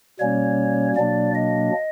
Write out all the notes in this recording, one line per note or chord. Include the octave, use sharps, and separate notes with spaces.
B2 G3 A#3 C#4 C#5
B2 F#3 A#3 D4 D5
D#5